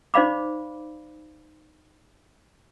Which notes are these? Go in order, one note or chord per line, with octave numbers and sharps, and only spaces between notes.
D#4 C5 D5 F5 B5 D6